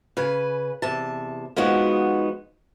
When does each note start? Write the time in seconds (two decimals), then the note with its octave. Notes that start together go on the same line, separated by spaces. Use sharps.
0.17 C#3 B4 G#5
0.82 E2 C3 A5
1.56 F3 G#3 B3 D#4 F#4